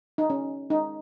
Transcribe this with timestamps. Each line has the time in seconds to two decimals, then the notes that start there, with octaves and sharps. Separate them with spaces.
0.18 D#4
0.30 C#4
0.70 D#4